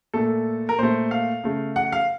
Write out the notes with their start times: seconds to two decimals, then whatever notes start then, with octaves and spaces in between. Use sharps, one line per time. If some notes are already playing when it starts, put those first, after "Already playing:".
0.14 A#2 A3 A4
0.69 A#4
0.78 A#2 A3 C5
1.11 F5
1.44 C#3 A3
1.76 F#5
1.92 F5